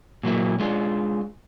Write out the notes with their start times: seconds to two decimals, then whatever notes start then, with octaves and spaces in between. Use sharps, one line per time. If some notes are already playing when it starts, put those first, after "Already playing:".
0.23 A#2 F#3 A#3 E4
0.60 G#3 D4 F4